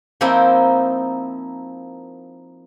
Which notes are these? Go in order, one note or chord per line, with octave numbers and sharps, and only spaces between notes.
F3 A#3 C4 D#4 E4